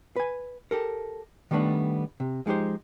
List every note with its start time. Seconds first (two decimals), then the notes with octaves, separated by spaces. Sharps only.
0.16 B4 G#5
0.71 G4 A4 A#4
1.51 D#3 G3 A3 B3 D4
2.20 C3
2.46 F3 G#3 D#4 G4 C5